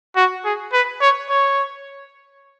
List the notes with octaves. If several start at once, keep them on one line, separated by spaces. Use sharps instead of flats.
F#4
G#4
B4
C#5
C#5